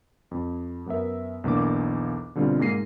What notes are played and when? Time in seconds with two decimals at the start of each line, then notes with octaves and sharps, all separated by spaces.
0.31 F2
0.86 F#2 B3 A#4 E5
1.44 B1 E2 A#3 D4 D6
2.35 B2 D3 G3 C4 F4
2.59 G#2 A#3 G#4 A#6 C7 D#7